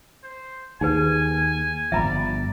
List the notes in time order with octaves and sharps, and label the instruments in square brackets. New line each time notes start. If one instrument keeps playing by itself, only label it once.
[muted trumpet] C5
[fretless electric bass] D#2 [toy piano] D#4 G#4 B4 [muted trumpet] G#5
[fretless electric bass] G1 C#2 F3 [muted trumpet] D5 [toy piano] E5 A#5 B5